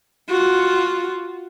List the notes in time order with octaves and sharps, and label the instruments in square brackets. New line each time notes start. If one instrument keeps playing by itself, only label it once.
[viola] F4 F#4